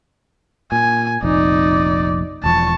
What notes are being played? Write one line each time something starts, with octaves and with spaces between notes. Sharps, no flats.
A#2 G#5
F1 A#1 F2 D#4 D5
E1 E2 F3 A5 C#6